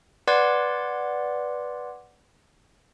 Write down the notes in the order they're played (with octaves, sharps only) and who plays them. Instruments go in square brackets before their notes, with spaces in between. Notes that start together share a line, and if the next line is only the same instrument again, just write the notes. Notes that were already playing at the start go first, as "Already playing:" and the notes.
[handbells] B4 D5 F#5 C6 D6 G#6